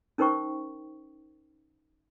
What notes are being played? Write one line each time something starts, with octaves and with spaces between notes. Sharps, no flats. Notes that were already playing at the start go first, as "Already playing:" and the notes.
C#4 D#4 A#4 C5 G5 C#6